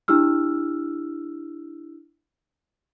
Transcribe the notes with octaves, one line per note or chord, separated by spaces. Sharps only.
D4 E4 G4 E6 F6